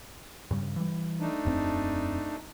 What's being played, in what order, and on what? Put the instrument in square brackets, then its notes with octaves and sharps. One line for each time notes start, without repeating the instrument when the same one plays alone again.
[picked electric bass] G2 C#3 G3
E3 G3
[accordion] A3 D4 D#4
[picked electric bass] E1 F#2 C4